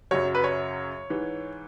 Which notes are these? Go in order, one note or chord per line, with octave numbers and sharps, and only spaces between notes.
F#2 C#3 F#3 C#5
B4
C#5
G#2 E3